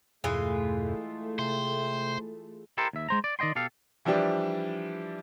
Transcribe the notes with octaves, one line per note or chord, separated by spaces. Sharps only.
E2 G2 B2 E3 G#3 A3 F4
C3 C5 E5 G5
E4 G4 A4 A#4 C5
D#2 E5
G#3 C5 A#5
D5
D#3 D5 D#5 G5 C6
B2 G4 A4 F5
E3 F3 G3 D4 G4